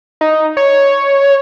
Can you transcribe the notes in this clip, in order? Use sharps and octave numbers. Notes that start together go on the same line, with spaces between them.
D#4
C#5